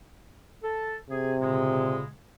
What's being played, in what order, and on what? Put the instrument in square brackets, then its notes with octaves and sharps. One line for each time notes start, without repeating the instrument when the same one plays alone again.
[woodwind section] A4 A5
[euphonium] C3 [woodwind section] G#4
[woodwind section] A#2 C#3 G#3